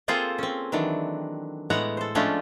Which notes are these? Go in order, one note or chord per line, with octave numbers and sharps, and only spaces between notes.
A#3 C4 F4 G#4 A4 C5
C4 C#4
D#3 E3 F#3 D4
A2 G#3 B3 C#5 F#5 A#5
A4 C5
F3 G#3 A3 C#4 D4 F4